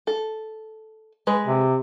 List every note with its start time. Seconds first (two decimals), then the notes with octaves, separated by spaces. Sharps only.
0.07 A4
1.27 G#3 B4
1.47 C3